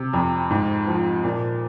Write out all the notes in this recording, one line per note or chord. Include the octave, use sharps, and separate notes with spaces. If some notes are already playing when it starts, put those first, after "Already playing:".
Already playing: C3
F2
G#2
F3
A#2